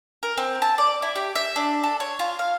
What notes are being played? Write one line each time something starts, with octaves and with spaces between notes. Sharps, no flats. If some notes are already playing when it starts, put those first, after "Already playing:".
A#4
C4
A5
D5
E4
G4
E5
D4
A4
C#5
F4
F5